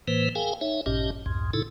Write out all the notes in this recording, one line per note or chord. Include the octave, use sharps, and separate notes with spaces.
A2 E3 A#3 B4 C5
G#4 A#4 F5 G5 G#5
D#4 C#5 E5
A1 G2 A#2 C#4 G4 D#5
C2 F2 G#2
A2 C#3 D#4 E4 A4